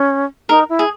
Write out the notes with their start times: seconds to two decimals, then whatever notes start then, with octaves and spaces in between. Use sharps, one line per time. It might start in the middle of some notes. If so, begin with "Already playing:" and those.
Already playing: C#4
0.49 D#4 A#4
0.69 E4
0.79 G#4